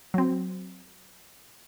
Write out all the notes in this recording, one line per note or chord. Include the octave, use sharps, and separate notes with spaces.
F#3 C4